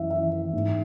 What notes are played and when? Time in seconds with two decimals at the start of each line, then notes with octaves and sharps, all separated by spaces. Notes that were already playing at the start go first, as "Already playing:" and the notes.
Already playing: F#2 E3 E5
0.10 E3 E5
0.32 E3
0.53 G#2